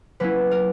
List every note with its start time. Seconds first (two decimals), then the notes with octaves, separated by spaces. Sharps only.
0.20 F#3 A#3 C#4 E4 B4
0.51 A#4